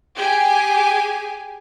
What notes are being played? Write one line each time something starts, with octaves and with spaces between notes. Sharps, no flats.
G4 G#4 G#5